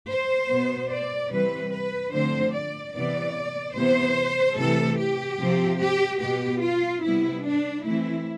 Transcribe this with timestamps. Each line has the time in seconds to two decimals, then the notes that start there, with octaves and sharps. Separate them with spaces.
0.08 C5
0.49 B2 B3
0.89 D5
1.30 C3 E3 G3 C4 B4
1.71 B4
2.12 D3 F3 A3 C4 C5
2.53 D5
2.93 C3 E3 B3 D5
3.75 C3 E3 B3 C5
4.56 C3 E3 A3 A4
4.97 G4
5.39 C3 F3 C4
5.79 G4
6.20 B2 B3 G4
6.61 F4
7.01 C3 G3 B3 E4
7.43 D4
7.84 E3 A3 C4 E4